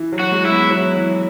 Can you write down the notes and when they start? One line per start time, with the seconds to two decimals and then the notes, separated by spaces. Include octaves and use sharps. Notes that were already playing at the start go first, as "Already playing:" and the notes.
Already playing: E3
0.12 F#3
0.19 F#4
0.32 G#3
0.46 E4
0.51 B3
0.71 F#3
0.96 E3